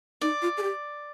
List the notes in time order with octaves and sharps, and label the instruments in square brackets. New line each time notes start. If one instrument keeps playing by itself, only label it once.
[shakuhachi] D#4 [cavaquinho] D5
[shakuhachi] F4
G#4
G4